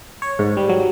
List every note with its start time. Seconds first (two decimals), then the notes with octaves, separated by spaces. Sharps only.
0.22 C#5
0.39 G#2
0.57 G3
0.69 F#3